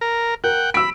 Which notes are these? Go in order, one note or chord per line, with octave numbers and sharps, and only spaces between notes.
A#4
A#4 F#5 G5
B5 E6 D7